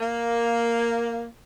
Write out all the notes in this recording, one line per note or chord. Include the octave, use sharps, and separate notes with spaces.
A#3